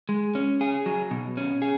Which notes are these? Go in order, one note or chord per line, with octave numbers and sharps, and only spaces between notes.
G#3
C#4
G#4
F#3
B2
C#4
G#4